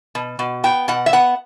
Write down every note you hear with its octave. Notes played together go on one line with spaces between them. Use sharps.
B2
B2
B3 G5
B2 F#5
E5
B3 F#5